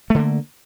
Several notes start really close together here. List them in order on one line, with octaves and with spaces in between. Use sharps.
A3 D3 A#3